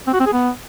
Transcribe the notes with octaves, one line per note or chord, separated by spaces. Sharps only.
C4
F#4
C4
G#4
B3